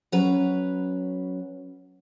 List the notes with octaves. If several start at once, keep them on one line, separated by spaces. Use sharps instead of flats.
F#3 C#4 B4 A#5